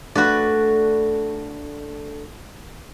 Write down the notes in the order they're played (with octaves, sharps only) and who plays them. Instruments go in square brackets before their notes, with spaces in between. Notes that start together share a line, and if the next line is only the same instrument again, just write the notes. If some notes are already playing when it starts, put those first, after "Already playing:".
[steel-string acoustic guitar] A3 D4 A4 [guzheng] F#4 B4 D5